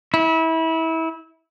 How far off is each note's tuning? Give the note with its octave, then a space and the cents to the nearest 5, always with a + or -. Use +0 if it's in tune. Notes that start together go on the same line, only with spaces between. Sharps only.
E4 -25